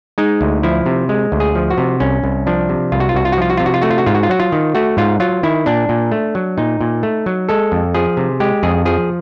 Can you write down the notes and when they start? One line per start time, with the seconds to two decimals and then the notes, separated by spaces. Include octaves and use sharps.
0.18 G#3 D#4
0.41 D2
0.63 F3 E4
0.86 C3
1.09 G#3
1.32 D2
1.40 G#4
1.55 F3
1.70 F#4
1.78 C3
2.00 C2 C#4
2.24 C2
2.47 F3 D4
2.69 C3
2.92 C2 F4
3.00 F#4
3.09 F4
3.14 C2 F#4
3.25 F4
3.32 F#4
3.38 F3 F4
3.50 F#4
3.57 C3 F4
3.66 F#4
3.74 F4
3.82 A3 F#4
3.91 F4
3.98 F#4
4.06 G#2 F4
4.14 F#4
4.23 F4
4.29 F#3 F#4
4.40 F4
4.52 D#3
4.75 A3 F#4
4.97 G#2 F4
5.20 F#3 F4
5.43 D#3 E4
5.66 A#2 D4
5.89 A#2
6.12 A3
6.35 F#3
6.58 A#2 D#4
6.81 A#2
7.03 A3
7.26 F#3
7.49 G#3 A4
7.72 F2
7.94 F3 G#4
8.17 C3
8.40 G#3 G4
8.63 F2 G#4
8.85 F3 G#4